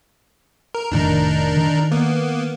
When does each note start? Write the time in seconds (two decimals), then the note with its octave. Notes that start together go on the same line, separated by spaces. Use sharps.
0.75 A#4
0.92 F1 A2 D#3 D4 D#4 A#4
1.57 D#3
1.92 A#3 B3